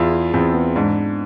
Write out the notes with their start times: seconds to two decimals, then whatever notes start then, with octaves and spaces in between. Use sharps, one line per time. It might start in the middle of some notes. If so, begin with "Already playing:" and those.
Already playing: E2 F4 G#4
0.13 E4
0.34 E2 C4
0.54 B3
0.76 G#2 D4